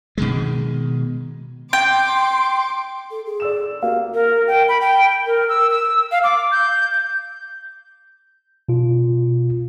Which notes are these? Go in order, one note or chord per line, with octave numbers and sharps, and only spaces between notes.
B2 D#3 G#3
G5 C6 D6
A4
G#4
D5 E6 E7
A#3 F#4 G4 F5
A#4
G5
B5
G5
A#4
E6
E6
F5
D6
G6
B2 F4